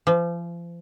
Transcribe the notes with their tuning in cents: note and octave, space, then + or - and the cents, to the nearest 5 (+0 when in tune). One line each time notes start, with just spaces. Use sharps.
F3 -35